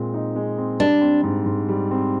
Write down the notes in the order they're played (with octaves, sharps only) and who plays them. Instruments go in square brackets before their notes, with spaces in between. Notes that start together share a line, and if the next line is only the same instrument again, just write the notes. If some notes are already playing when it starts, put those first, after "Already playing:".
Already playing: [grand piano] A#2 G#3 C4
D#4
G#3
C4
[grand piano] G3 [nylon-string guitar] D4
[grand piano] C4
G#2
G#2
G3
C4